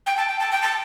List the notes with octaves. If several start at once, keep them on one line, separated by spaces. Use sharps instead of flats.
G5
A5
G5
A5
G5
A5